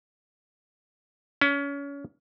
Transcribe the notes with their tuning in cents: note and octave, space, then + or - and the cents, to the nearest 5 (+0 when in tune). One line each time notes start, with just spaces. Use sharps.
C#4 +30